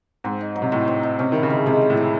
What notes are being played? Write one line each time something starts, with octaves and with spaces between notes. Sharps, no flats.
G#2 C4
D#4
F#3
C3
A2 F#4
C4
D#4
C3 C#4
D#3 E4
C#3
G#3
C3 G#3
C#4
A2
E4